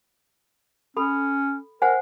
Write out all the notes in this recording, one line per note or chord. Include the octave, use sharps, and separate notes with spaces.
C#4 A4 B5
A#4 C5 F#5 G#5